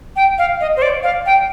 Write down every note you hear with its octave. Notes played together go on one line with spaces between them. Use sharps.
G5
F5
D#5
C5
D5
F5
G5